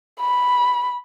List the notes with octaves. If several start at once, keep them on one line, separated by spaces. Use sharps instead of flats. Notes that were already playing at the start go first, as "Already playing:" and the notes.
B5